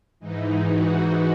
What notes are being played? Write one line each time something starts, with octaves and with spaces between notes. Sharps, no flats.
G#2 E3 D#4
F#4